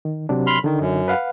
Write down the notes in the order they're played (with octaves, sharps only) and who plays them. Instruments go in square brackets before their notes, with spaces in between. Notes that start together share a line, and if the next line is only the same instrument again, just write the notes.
[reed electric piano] D#3
C3 F#3 D4
[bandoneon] B5 C6 F6
[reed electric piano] D3 D#4 [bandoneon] D#3
[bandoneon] F#2
[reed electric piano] B4 F5 F#5